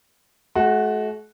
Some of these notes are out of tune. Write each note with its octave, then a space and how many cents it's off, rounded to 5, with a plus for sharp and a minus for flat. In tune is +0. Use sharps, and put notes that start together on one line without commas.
A3 -45 F#4 +0